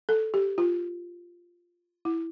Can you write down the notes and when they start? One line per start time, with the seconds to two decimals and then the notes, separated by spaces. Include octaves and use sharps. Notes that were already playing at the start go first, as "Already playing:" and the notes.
0.09 A4
0.34 G4
0.58 F4
2.05 E4